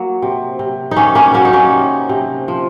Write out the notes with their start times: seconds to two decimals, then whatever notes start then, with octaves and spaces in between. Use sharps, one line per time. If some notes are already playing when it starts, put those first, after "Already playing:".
Already playing: F#3 A#3
0.22 C3
0.59 C3
0.91 D#4
0.96 D#3 A#3 C#4
1.15 A#3 C#4
1.34 F#3 A#3 C#4
1.45 D#4
1.53 A#3 C#4
1.72 C3
2.09 C3
2.48 F3